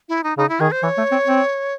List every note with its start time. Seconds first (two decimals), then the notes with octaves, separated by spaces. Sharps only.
0.09 E4
0.24 D#4
0.38 C#3 D#4
0.49 E4
0.60 D#3 G#4
0.72 C5
0.83 E3 C#5
0.97 A3
1.12 C4
1.28 C4